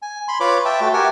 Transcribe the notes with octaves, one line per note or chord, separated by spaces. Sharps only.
G#5
B5 C6
F4 B4 C#5 B5 D6
E5 G5 A5
A3 F#4 G5
G4 A#4 F#5 G#5 A5